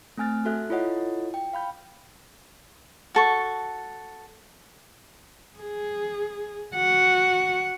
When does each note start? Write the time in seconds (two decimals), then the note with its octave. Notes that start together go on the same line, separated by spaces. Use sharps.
0.17 A3 C4 G#5 F6 A6
0.45 F#4 A4 E5 F#6
0.69 E4 F4 A4 C#5 D#5 F#5
1.34 G5
1.53 F5 B5 G6
3.15 F#4 A4 C#6
5.58 G#4
6.75 F#4 F#5